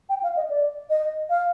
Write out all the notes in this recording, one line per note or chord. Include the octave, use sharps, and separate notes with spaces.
G5
F5
D#5
D5
D#5
F5